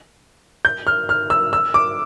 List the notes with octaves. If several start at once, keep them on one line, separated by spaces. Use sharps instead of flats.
G6
F6
F6
E6
E6
D6